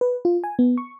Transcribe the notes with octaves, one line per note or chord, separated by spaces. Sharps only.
B4
F4
G#5
B3
C#6